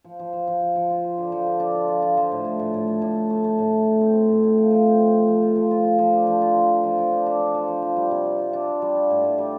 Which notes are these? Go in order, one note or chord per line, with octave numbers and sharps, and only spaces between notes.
F3
F3
F3
F3
F3
F3
F4
F4
D3
F3
D3
D4
F4
F4
F4
F3
A2
A2
A2
A2
A3
A2
A3
A3
A3
A2
A3
A2
C4
C4
A2
A2
F3
F3
C4
F3
F3
F3
F4
F3
F4
F4
F3
D4
F3
F4
F3
F4
F3
F3
D4
D4
D4
F3
F3
F3
G3
C3
F4
F4
D4
F4
G3
F4
A2
A2
G3